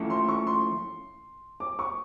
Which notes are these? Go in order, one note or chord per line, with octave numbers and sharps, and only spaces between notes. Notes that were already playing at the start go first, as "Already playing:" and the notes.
Already playing: F3 A3 C#4 E4
C6
C#6
C6
D6
C#6